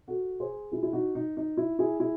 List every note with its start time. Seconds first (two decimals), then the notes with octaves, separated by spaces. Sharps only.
0.08 F#4 A4
0.40 G#4 C5
0.72 E4 G#4
0.83 E4
0.93 D#4 F#4
1.15 D#4
1.37 D#4
1.57 E4
1.79 E4 G#4
2.00 E4 G#4